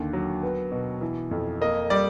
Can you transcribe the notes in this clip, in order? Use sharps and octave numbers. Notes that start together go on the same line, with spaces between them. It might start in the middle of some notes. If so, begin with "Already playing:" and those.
Already playing: D#2 D3
F#3
B3
B2
E3
F2
A#3 D#5
G3 D5